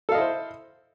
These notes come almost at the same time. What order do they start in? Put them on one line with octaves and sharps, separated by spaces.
A4 F5 D#5 E4 C5